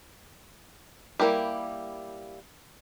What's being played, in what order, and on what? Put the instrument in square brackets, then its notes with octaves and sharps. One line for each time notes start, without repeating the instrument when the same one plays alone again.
[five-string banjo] G3 A#3 E4 G4